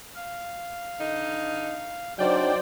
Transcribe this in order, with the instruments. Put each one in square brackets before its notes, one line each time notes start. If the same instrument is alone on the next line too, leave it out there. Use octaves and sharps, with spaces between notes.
[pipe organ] F5
[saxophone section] D3 D#4
[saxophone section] C#3 [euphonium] F#3 [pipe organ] D4 D#4 [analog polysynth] C5 D5 G5